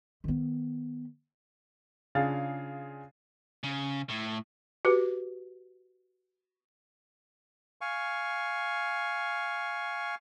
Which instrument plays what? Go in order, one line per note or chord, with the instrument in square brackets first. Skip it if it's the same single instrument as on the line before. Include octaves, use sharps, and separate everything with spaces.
[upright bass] D#3 B3
[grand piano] C#3 D4 F4 G#4 F5 A6
[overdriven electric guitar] C#3
A2
[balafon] F#4 G4 B4
[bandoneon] F5 G#5 C#6